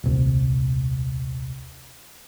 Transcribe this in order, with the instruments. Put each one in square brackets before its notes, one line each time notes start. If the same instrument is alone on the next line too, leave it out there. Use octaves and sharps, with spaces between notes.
[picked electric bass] D#1 C2